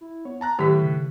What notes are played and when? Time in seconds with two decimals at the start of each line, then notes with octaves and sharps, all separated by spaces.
0.01 E4
0.25 B3 C#5
0.41 A5 A#5 F#6
0.59 A2 D#3 F#3 G4 B6
0.82 C#3